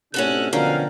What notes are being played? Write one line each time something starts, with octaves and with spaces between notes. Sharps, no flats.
A2 C3 C#4 D4 F#4 A4 F#6
B2 D3 F3 F#3 C#4 A#4 F5 G5